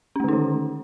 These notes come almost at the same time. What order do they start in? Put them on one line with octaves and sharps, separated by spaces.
C#4 A3 D3 D#4 D#3